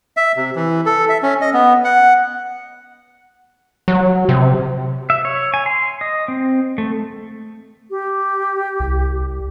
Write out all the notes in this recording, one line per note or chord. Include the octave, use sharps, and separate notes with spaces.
E5
C3
E3
A4
E5
C#4
D#5
B3
F#5
F#3
C3
E5
C#5
G#5
C6
D#5
C4
A3
G4
C2